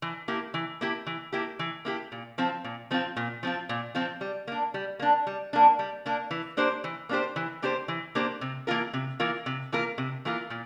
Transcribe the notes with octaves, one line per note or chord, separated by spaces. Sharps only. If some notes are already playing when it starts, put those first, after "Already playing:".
E3
A#3 E4 G4
E3
A#3 E4 G4
E3
A#3 E4 G4
E3
A#3 E4 G4
A#2
F3 C4 F4
A#2
F3 C4 F4
A#2
F3 C4 F4
A#2
F3 C4 F4
G3
A#3 D4
G3
A#3 D4
G3
A#3 D4
G3
A#3 D4
E3
A#3 D4 G4 C5
E3
A#3 D4 G4 C5
E3
A#3 D4 G4 C5
E3
A#3 D4 G4 C5
C3
E3 A#3 F4 A#4
C3
E3 A#3 F4 A#4
C3
E3 A#3 F4 A#4
C3
E3 A#3 F4 A#4
A#2